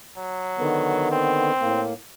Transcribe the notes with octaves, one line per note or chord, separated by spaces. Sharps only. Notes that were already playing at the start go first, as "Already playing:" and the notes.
F#3
D3 D#3 B3
C4
A2 A#3